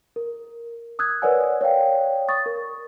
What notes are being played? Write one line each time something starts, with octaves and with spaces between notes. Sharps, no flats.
A#4
D#6 E6 F#6 G#6
A#4 B4 C#5 D5 F#5 G#5
C#5 D5 F5 G5
C#6 D#6 A6
A#4